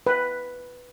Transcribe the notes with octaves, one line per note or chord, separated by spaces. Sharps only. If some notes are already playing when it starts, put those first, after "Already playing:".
B4